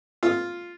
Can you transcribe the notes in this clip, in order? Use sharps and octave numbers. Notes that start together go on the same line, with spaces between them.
F4